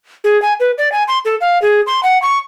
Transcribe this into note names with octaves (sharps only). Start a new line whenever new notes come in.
G#4
G#5
B4
D5
G#5
C6
A4
F5
G#4
C6
F#5
C#6